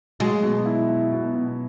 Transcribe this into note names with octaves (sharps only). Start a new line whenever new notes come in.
F#3 G#3
B2
E4
E4
B2
B2